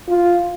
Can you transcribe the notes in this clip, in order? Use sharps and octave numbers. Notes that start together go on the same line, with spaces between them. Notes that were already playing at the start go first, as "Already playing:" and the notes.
F4